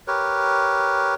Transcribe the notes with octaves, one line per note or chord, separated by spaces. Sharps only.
G4 A#4 B4 C#5